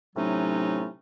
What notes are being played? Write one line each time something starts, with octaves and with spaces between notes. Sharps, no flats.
A2 C3 F#3 A3 C#4 D#4